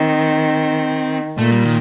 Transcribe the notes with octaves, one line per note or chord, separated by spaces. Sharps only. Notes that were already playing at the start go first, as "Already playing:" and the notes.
Already playing: D#3 C4
A#2 A3
G3
D#3